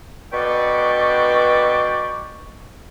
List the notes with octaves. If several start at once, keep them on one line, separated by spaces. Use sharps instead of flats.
B2 D3 B4 D5 G5 C#6